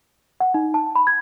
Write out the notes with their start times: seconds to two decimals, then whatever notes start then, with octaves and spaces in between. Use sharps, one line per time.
0.40 F#5
0.54 D#4
0.74 A5
0.96 B5
1.07 G#6